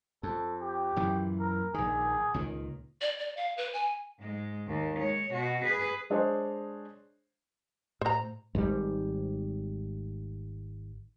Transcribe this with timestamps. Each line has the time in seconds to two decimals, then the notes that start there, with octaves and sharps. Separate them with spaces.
0.23 F2 A4
0.61 G4
0.96 F#2 A#2 E3
1.40 A#4
1.74 A#1 D#3 G#4
2.34 C#2 A#2 D#3
3.01 D5
3.19 D5
3.37 F5
3.57 B4
3.73 G#5
4.19 G#2 G#3
4.67 D#2
4.99 G#3 C#5
5.33 B2 F#4
5.64 G#4 B4
6.10 G#3 D4 G#4 C5 C#5 D#5
8.01 A2 C5 A#5
8.55 G#1 G#2 D3 G3